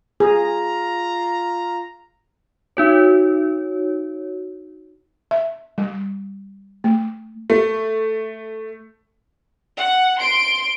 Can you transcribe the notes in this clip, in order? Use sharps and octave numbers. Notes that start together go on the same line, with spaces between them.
F4 G#4 A#5
D#4 F#4 C#5
E5
G3
A3
A3
F#5
C6 D7